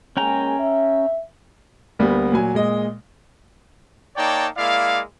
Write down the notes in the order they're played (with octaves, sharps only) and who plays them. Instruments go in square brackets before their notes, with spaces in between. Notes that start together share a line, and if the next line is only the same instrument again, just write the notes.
[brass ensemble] G#3 A#3 G#5 [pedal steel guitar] C#4 G5 A#5
[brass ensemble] E5
[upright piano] D2 G3 A#3 B3
A#2 F#3 G#5
A#2 G#3 D#5
[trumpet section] A#3 D#4 C#5 D5 G5 A5
G#3 A#3 E4 D5 F5